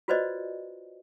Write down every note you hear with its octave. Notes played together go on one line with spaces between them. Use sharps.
F4 F#4 B4 C5 D5 D#5